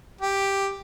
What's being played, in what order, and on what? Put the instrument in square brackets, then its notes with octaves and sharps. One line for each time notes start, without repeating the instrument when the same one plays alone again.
[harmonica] G4